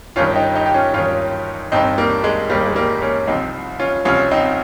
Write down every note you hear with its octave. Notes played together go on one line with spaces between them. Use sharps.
G1 G2 D#3 C#4 F4
D#4 G4
D#4 G4
G4
C#4 F4
G1 G2 D#3 C#4 F4
G1 G2 D#3 C4 D#4
G3 A#3
G#3
G1 G2 D#3 G3 A#3
G#3
G3 A#3
A#3 C#4
C2 C3 F3 C4 D#4
C#4 F4
C2 C3 F3 C#4 F4
C4 D#4